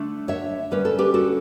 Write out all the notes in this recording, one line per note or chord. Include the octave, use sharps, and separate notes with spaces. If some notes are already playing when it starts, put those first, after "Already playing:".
Already playing: D3 A3 D4
C#5 E5
D3 G3 C#4 B4
A4
G4 B4
F#4 A4